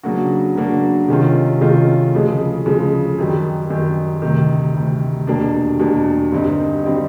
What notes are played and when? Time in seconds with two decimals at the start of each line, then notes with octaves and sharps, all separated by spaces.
0.03 C#3 F#3 A#3 D4 F#4
0.55 C#3 F#3 A#3 D4 F#4
1.08 C3 D#3 G#3 C#4 F4
1.60 C3 D#3 G#3 C#4 F4
2.13 D2 C#3 F3 G#3
2.65 D2 C#3 F3 G#3
3.18 F#2 D#3 G3
3.70 F#2 D#3 G3
4.22 D2 C3 D#3
4.74 D2 C3 D#3
5.27 E2 B2 G3 A#3 D4
5.79 E2 B2 G3 A#3 D4
6.32 G2 D3 G3 C4 D#4
6.84 D3 G3 C4 D#4